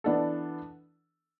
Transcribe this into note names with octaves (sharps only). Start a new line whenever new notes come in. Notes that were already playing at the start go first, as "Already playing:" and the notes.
E3 B3 D4 A4